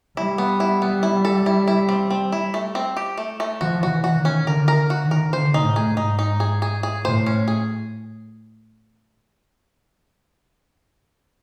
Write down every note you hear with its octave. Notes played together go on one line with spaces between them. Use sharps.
G3 E4
B3
E4
B3
E4
A4
E4
E4
C4
C4
E4
A3
C4
G4
A3
A3
F3 F#4
F#4
E3
F#4
D#3
C#4
D3 A#4
A#4
F#4
D#3
A#4
D3 C5
D#4
A2
G#4
G#2
D#4
D#4
G#4
G#4
G#4
A2 C5
C#4
G#4